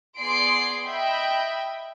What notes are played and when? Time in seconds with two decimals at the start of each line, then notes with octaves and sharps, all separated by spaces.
0.18 B3 G#4 D5 C6 C7 D7
0.87 D#5 E5 G5 B5